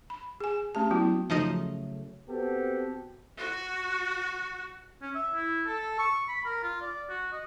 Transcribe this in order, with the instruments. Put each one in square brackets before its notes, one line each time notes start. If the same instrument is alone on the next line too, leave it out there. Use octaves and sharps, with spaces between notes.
[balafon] B5
G#4 G#5
A3 C#4 G4 A5
F#3 B3 E4 F#4
[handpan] C#3 F#3 A3 [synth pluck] F3 D#4 D#5
[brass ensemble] B3 C4 F#4 G4 A4
[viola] F#4
[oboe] C#4
E5
E4
A4
C#6
B5
A#4
F4
D5
F#4
D#5